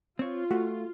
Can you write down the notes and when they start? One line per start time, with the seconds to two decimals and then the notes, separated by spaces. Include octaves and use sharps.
0.19 C4 F4 C#5
0.51 A3 F#4